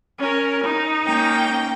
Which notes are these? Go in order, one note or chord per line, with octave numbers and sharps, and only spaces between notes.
C#4 A#4
D#4
A#3 C#4 G5